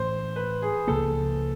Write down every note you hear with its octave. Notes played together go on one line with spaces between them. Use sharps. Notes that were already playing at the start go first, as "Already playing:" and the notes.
Already playing: A2 E3 A3 C#4 C5
B4
G#4
C#2 C#3 F3 A#3 A4